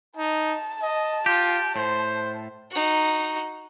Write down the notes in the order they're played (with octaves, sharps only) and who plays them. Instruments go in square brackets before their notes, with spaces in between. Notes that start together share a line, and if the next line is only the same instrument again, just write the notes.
[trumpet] D#4 [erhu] A5
[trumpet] D#5
[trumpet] F4 [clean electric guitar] G4
[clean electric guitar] A2 [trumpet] C5
[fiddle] D#4 F#4